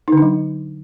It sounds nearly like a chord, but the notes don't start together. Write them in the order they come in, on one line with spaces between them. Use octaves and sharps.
D#4 D3 D4 F#3